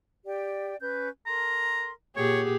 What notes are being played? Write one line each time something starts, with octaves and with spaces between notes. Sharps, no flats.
G4 D5 G5
C#4 B4 G6
A4 A#4 A#5 C6
A#2 G4 G#4 C#5 F#5